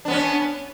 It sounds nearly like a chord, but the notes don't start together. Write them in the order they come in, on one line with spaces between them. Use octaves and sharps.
D4 B3 C#4